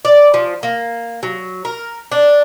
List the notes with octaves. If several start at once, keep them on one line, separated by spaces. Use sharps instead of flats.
D5
F3
A#3
F#3
A#4
D4